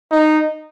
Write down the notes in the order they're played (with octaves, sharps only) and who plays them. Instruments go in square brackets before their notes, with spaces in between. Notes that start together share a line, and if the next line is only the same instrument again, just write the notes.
[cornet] D#4